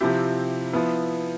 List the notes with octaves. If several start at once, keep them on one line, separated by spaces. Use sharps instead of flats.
C3 F3 C4 E4 G4
F3 B3 E4